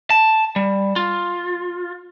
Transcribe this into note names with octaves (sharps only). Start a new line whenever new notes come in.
A5
G3
F4